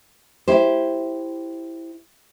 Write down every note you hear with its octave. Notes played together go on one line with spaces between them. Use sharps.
E4 G4 C5